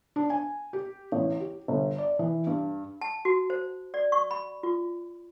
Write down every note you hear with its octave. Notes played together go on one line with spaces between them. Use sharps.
D4
G#5
G4
A1
G4
G1
D5
E3
G2
A5
F#4
C5
D5
C#6
B5
F4